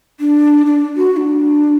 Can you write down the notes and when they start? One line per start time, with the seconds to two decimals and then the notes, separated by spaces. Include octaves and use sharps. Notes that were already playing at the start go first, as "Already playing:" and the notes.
0.20 D4
0.66 D4
0.96 F#4
1.12 F#4
1.17 D4